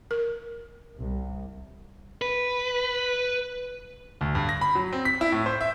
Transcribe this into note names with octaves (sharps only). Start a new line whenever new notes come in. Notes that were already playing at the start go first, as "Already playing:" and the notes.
A#4
C2
B4
D2
G2
A#6
B5
F#3
C4
B6
E4
A2
C5
E5